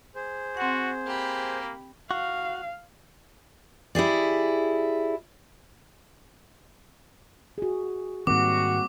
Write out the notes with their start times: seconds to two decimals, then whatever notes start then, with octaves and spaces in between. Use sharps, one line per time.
0.15 G#4 C5
0.57 C4 F#4 F#5
1.06 A#3 G4 B5
2.11 F#4 F5
3.95 E4 G4 G#4 D5
7.58 F#4 G#4
8.27 G#2 D#3 G3 A#3 C4 F#4 D6